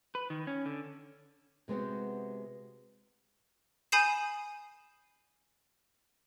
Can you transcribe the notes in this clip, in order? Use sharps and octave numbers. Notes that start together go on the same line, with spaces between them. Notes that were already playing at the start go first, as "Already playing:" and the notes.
B4
D#3
C#4
D3
C3 G#3 B3 C4 F#4
G#5 B5 D#6 G6 C7 E7